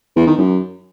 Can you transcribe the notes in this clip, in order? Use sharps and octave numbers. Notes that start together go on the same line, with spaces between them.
E2
D#3
F#2